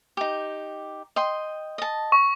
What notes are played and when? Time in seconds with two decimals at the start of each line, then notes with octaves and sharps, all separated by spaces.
0.17 D#4 G4
1.16 D#5 G5 C6
1.78 D#5 A5
2.12 C#6